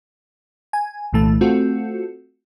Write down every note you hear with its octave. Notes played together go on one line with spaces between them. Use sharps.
G#5
C2 A#2 E3 A3 A5
A3 C4 F4 F#4 A4